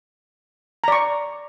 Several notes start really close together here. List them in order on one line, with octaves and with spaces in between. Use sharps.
A#5 D5 C#6